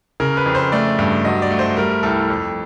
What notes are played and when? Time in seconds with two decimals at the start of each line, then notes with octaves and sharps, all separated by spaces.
0.20 C#3 A#4
0.37 B4
0.46 F2
0.55 C5
0.72 A3 D5
0.99 G2
1.25 F#3 D#5
1.42 D5
1.50 A3
1.59 C5
1.77 G3 A#4
2.03 C2 A4
2.30 F2